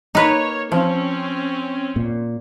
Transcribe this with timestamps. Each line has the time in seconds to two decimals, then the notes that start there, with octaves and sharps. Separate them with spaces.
0.15 A#3 D#4 B4 C#5
0.72 F3 C4 C#4
1.96 A#2